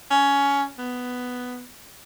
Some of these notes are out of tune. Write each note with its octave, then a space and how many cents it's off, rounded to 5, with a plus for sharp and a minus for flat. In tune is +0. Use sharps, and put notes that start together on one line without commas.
C#4 +15
B3 +5